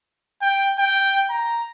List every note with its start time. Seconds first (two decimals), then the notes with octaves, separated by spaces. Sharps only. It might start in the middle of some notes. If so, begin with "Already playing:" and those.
0.42 G5
0.79 G5
1.30 A#5